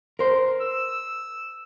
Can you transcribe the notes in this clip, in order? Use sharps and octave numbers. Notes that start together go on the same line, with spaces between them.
A#4 C5
E6